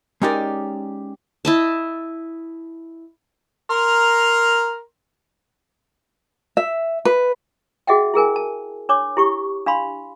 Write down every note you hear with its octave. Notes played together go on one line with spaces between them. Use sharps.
G#3 C#4 D#4 G4 A#4 D5
E4 D#5 A5
A#4 A#5 C6
E5
B4
F#4 G#4 D#5 E5 F#5 G5
E4 G#4 A#4 G#5
A5
D4 C#5 D6
E4 G4 C#6
D4 F5 B5 C6